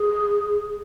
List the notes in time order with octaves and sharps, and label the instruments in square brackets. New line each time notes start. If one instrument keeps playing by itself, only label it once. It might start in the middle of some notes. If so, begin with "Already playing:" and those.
Already playing: [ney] G#4